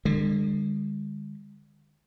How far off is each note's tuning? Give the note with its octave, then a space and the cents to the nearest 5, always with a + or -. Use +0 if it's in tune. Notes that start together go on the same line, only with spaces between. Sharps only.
D3 +35 G#3 -40